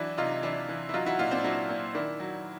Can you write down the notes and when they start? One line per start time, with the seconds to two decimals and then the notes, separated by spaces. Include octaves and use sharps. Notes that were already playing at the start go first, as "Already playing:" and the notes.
Already playing: E3 F#3 D4 E4
0.18 C3 D#4 F4
0.33 D#4
0.43 E3 D4 E4
0.69 E3
0.89 E4
0.94 F#3 D#4 F4
1.06 E4 F#4
1.19 A#2 D#4 F4
1.31 C4 D4
1.44 F#3 D4 E4
1.69 A#2
1.94 D#3 D4 E4
2.20 F#3